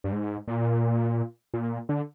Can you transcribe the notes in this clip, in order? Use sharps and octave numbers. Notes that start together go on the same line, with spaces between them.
G2
G#2
A#2
A#2
D3